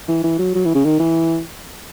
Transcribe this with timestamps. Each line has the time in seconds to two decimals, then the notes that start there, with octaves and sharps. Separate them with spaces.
0.08 E3
0.24 E3
0.39 F#3
0.55 F#3
0.65 E3
0.75 C#3
0.85 D#3
1.00 E3